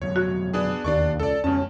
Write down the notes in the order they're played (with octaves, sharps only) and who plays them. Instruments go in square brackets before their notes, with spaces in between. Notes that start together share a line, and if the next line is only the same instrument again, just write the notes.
[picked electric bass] F2 B2 F#3 [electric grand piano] C#5
[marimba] F#4
[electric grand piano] B3 D4 G#4
[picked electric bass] E1 [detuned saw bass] D#2 [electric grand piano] D4 D5 C#6
[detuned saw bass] C#2 [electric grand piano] A4 D5
[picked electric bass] F2 G#3 [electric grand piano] B2 A5 [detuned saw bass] C#4